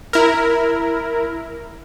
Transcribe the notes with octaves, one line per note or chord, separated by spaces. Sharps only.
E4 A#4